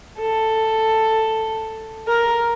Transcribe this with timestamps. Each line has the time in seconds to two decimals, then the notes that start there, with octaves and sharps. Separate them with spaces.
0.19 A4
2.07 A#4